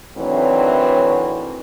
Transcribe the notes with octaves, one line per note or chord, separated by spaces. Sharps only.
A2 D#3 E3 F#3 C4 D4